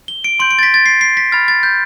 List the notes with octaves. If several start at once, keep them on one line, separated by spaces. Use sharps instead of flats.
G7
D7
C6 G6 D7
D7
A6
B6
A6
C7
C7
B6
B5 F6 A6
A6
G6